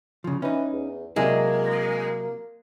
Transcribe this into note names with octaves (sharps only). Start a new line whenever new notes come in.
C#3 F3
E3 C#4 D#4
E2
C3 F#3 G#3 A#3 E4